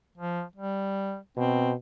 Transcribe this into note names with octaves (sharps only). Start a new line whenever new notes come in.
F3
G3
B2 C4